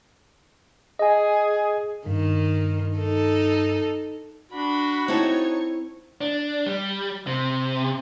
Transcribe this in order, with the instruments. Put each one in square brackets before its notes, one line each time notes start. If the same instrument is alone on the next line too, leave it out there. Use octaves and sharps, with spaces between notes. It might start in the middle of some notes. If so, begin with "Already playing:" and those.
[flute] G#4 [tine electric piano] D#5 G#5
[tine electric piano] G2 [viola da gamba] D#3
[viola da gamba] D#4 A4
[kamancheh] D4 B5 [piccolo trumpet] F#4
[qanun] C4 E4 A4 [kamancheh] D#4 C#5
[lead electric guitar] D4
G3
C3